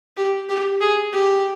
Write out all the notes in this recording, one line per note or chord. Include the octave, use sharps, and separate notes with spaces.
G4
G4
G#4
G4